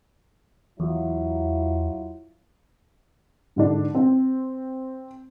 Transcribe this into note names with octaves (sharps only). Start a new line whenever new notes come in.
E2 F#3 E4 F4
G#2 D3 D4
C4